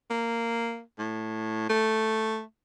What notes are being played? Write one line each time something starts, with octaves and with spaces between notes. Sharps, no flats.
A#3
A2
A3